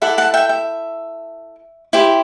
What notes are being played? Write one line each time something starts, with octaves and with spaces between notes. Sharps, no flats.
E4 A4 D5 F#5
F#5 A5
E5 G5
E5
E4 G4 C5